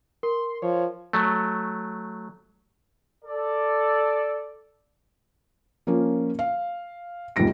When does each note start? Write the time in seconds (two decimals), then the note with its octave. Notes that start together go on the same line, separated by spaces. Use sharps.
0.23 A#4 C6
0.62 F3 C#5
1.13 F#3 A3
3.25 A4 D5
5.87 F3 A#3 C#4 F4
6.39 F5
7.36 F1 C#2 G#2 G3 A#6 D7